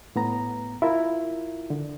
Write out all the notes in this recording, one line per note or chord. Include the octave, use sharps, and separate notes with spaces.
A2 B3 A#5
E4 F4 A#4
D3